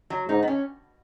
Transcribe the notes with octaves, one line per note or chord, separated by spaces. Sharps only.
F#3
G#2 D#4
B3
C#4